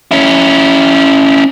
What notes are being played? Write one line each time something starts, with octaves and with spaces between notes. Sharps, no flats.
C#4 E4